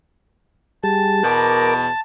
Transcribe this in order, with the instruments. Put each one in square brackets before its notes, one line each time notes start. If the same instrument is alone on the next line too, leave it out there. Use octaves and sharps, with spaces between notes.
[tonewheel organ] G3 G4 G#4 [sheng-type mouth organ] A5
[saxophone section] E2 B2 [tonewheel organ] A#4 A#5 D6